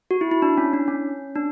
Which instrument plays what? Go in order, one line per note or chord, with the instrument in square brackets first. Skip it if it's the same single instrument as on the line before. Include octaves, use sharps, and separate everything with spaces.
[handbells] F#4
E4
E4
D4
C#4
D4
C#4
D4